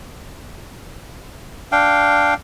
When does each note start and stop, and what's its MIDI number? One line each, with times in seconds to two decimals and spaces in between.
1.72 2.34 62
1.72 2.34 77
1.72 2.34 79